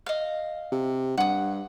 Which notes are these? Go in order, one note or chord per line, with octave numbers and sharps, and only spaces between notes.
D#5 F5
C3
G2 F#5 D#6